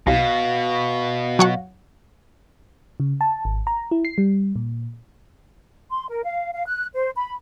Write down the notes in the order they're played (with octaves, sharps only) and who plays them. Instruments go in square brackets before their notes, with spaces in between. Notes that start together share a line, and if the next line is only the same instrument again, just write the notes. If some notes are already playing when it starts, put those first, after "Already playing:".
[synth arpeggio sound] C2 [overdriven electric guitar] B2 [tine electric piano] F5 A#6
[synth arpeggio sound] F#3 C#5 F#5
[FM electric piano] C#3
A5
G#1
A#5
E4
C7
G3
A#2
[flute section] C6
A#4
F5
F5
F#6
C5
B5